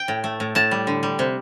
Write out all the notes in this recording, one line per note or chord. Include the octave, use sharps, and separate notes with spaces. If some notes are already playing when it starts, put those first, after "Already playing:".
Already playing: G5
A2
A3
A2
A2 A5
G3
D3
G3
C3